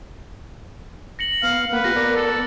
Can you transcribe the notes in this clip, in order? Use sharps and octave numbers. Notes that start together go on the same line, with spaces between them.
A#6 C#7 F#7
B3 F5
A#3 B4 F#5
B3 F4 G4 A#6
B3 A#4 D5
A4